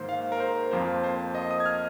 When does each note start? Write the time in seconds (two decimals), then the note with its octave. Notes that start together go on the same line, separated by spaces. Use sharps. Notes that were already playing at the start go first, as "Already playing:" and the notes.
Already playing: G#2 D#3 A#3 C5
0.09 F5
0.32 A#4
0.40 C5
0.71 F2 F3 A#3 C5
1.04 C5
1.35 D#5
1.51 D#6
1.60 G#6
1.66 F6